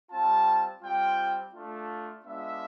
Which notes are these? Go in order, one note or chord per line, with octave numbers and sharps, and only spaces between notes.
G3 C4 F4 A5
G3 C4 F4 G5
A3 D4 F4
G#3 B3 D4 F4 E5